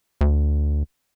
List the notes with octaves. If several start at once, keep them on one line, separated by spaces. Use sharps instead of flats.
D2